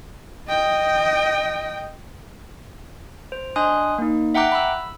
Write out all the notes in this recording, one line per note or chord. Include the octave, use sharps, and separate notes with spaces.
D#5 G5
C5
D4 D#5 G#5 C6 D#6 F#6
A#3 D#4
E5 F#5 G5 A#5 D6 F#6
B5 E6